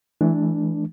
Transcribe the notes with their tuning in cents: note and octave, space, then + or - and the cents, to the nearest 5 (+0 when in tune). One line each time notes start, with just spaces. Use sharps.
E3 +0 A3 -45 D4 +0